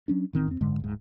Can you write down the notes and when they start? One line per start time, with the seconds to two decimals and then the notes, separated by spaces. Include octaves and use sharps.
0.08 F#3 C#4 D4
0.33 A1 D#3 C4
0.48 F2 C4
0.61 F#1 G#2 D3 G#3
0.80 D1 G#2